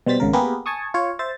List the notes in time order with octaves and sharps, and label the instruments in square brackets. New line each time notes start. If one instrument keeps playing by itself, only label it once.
[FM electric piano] B2 G3 C5 A6 B6
G#1 C#3 A#4
A#3 B3 G4 G#4 A#4 B4
G#5 A5 C#6 D#6
F4 C#5
C5 E5 A6